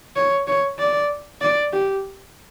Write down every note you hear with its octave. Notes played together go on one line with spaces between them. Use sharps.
C#5
C#5
D5
D5
G4